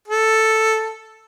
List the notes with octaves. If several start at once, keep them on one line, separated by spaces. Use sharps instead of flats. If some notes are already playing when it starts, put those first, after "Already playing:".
A4